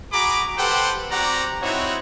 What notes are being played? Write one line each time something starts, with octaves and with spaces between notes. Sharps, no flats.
F#4 G#4 A#5 B5 D6
G4 A4 B4 C5 F#5 G5
C4 F#4 G4 D5 F#5 A#5
C4 D#4 E4 F#4 C#5